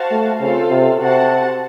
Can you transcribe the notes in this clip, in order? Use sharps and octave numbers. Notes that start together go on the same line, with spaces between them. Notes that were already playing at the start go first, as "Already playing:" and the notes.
Already playing: F#4 C5 F5 A5
A3
C#3 C4 F4 A4 C5 F5
C3
C3 C4 F#4 C5 F#5 A5